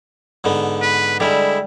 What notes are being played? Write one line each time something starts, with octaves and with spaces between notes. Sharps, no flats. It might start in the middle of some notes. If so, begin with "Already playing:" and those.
G#2 D3 B3
B4
D3 G3 G#3 E4